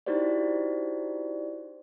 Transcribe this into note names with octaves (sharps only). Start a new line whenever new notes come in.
D#4 E4 F#4 G4 C5 D5